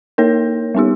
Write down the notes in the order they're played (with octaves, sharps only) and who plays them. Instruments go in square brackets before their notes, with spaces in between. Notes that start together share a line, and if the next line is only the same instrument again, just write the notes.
[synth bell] A#3 D#4 A#4 C#5
G3 B3 D#4 G4